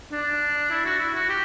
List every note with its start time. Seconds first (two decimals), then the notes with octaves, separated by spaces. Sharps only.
0.12 D4
0.70 E4
0.85 F#4
0.99 E4
1.15 F#4
1.29 G4